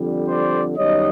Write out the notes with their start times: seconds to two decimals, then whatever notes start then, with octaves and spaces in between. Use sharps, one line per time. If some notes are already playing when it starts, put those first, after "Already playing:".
Already playing: F2 D3 G3
0.28 C5 D5
0.76 F#2 D#3 G3 B3 D#4 C#5 D#5